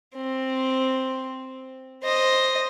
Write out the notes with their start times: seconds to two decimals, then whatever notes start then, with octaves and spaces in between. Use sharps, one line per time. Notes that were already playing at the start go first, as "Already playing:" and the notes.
0.15 C4
2.03 C5 D#5